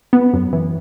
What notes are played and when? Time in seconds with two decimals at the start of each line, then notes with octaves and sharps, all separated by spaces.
0.13 B3
0.34 F#2
0.53 E3